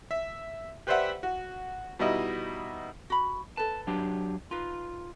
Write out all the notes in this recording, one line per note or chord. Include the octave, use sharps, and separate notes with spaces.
E5
G4 B4 C5 D5 E5 F#5
F#4
B2 G3 D#4 E4 D#5
F#4 B5
A4 B4 A5
F#3 D4 G4
D#4 F4 B4